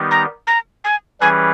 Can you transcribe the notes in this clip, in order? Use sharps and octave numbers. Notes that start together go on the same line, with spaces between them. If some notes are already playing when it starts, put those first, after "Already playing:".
Already playing: D#3 G3 B3 D#4 G4
A#5
A#5
G#5
E3 G3 C#4 G#4 B4 G#5